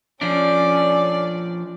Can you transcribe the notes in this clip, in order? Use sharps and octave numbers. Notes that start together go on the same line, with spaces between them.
F3 C#4 D4 A4 D5